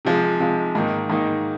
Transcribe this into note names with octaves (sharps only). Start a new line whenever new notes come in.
C3 F3 G#3
C3 F3 G#3
G#2 D#3 A#3 D#4
G#2 D#3 A#3 D#4